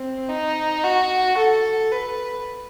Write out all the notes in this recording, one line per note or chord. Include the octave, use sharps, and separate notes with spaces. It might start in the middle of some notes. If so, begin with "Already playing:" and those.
Already playing: C4
D#4
F#4
A4
B4